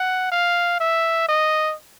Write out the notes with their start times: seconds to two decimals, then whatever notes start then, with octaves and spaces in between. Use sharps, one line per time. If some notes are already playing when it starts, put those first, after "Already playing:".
Already playing: F#5
0.31 F5
0.80 E5
1.29 D#5